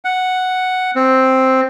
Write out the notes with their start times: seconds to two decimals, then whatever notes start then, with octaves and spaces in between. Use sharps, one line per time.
0.05 F#5
0.95 C4